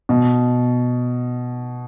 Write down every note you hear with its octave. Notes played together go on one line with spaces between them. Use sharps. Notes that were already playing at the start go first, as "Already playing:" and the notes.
B2